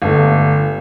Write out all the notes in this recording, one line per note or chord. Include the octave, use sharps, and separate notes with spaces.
G1 A3